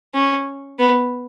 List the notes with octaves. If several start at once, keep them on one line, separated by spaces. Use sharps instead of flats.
C#4
B3